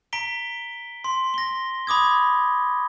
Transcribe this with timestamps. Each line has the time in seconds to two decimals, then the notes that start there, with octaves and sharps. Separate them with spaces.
0.13 A#5 B6 D7 G7
1.04 C6
1.34 A#6 G7
1.87 B5 D6 D#6 G#6